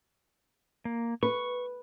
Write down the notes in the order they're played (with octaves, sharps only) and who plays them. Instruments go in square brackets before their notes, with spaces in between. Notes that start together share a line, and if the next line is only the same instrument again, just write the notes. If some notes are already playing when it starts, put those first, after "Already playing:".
[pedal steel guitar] A#3
[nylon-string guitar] B4 [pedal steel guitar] C#6